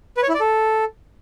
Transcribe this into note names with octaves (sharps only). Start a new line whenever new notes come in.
B4
C#5
E4
D5
A4